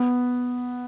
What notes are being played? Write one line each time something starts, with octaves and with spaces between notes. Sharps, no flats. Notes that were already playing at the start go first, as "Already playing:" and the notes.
Already playing: B3